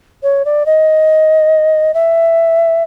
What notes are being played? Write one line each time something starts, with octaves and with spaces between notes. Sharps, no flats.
C#5
D5
D#5
E5